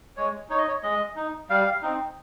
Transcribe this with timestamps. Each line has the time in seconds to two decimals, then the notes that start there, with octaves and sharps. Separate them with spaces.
0.17 G#3 C#5
0.50 D#4 C#5
0.58 D#5
0.68 C#5
0.83 G#3 D#5
1.16 D#4
1.49 G3 F5
1.83 C4 D#4